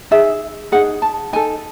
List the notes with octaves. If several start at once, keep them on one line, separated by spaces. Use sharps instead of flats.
D#4 G#4 E5
D#4 G#4 F#5
A5
D#4 A4 G#5